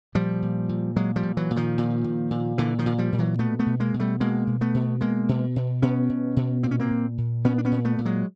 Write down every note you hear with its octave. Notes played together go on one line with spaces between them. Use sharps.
A#2 F3 G3
A#2
A#2
A#2 F#3 G#3
F3 G3
A#2
E3 F#3
A#2
D#3 F3
A#2
A#2
A#2
A#2 D3 E3
D#3 F3
A#2
F3 G3
A#2
E3 F#3
B2 A3 B3
A3 B3
B2
G#3 A#3
B2
G3 A3
B2 G#3 A#3
B2
A3 B3
B2
B2 G#3 A#3
B2
B2
B2 B3 C#4
B2
B2
A#2 C4
C#4
A#3 C4
A#2
A#2
A#2 B3 C#4
D4
B3 C#4
A#2
A3 B3
A#2
F#3 G#3